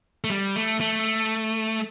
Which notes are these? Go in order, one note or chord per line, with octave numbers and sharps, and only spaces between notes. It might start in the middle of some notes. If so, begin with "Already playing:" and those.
A3
G3
A3
A3